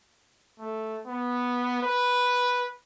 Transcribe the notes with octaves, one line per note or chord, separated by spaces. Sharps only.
A3
B3
B4